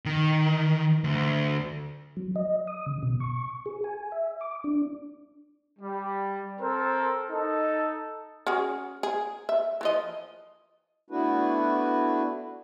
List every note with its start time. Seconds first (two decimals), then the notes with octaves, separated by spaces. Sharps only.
0.06 D#3
1.04 D2
2.17 F#3
2.36 D#5
2.67 D#6
2.86 C#3
3.03 B2
3.20 C#6
3.66 G#4
3.84 G#5
4.12 E5
4.41 D6
4.64 D4
5.80 G3
6.59 C4 A4 A#4 C5
7.29 D#4 A4
8.47 C#4 F#4 G#4
9.03 G#4
9.49 E5
9.81 E3 F3 D#5
11.10 A3 B3 D4 E4 F#4 B4